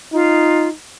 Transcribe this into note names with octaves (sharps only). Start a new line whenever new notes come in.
D#4 F4